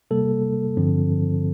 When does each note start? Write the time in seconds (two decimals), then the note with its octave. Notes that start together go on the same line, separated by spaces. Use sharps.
0.11 C3 G3 A#3 A4
0.77 G2 D3 F3 C4